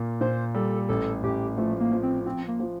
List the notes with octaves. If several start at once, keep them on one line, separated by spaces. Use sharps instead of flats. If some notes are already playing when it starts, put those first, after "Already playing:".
Already playing: A#2 A#3
A#2 C5
G3 A4
A1 A4
A1 G4
F3 A3
A#3
F3
C4
F3 C4
A#3
F3